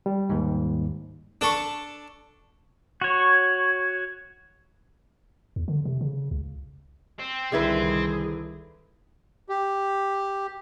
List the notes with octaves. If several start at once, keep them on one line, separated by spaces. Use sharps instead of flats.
G3
D#2 G#2
D4 A4 B5 C#6
F#4 C#5
E2
D3
C3
C#3
C#2
C4
C2 D3 D#3 G3 E4 G#4 B4
G4